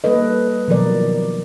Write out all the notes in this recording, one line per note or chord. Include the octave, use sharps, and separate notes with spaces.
G3 A#3 A4 B4 D#5
B2 D#3 F3 F#3 A#4 D5